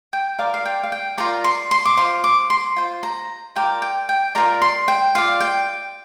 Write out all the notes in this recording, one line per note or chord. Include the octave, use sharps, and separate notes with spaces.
G5
F4 A#4 D5 F5
F5
G5
F5
G5
F4 A#4 D5 A#5
C6
C6
D6
F4 C5 C6
D6
C6
F4 C5
A#5
F4 A#4 D5 G5
G5
G5
F4 A#4 D5 A#5
C6
G5
F4 D5 F5
G5